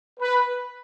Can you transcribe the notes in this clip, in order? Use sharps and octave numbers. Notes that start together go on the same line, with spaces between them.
B4